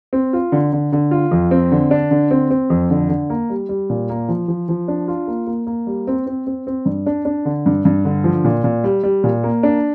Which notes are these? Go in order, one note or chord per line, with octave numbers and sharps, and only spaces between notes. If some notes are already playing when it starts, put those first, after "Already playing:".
C4
F4
D3
D3
D3
F4
F2
C4
D3
D4
D3
C4
C4
F2
D3
D3
A#3
G3
G3
A#2
A#3
F3
F3
F3
D4
F4
A#3
A#3
A#3
G3
C4
C4
C4
C4
G2
D4
D4
D3
G2
G2
D3
F3
A#2
A#2
G3
G3
A#2
A#3
D4